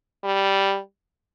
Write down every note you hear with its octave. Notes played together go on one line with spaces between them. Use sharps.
G3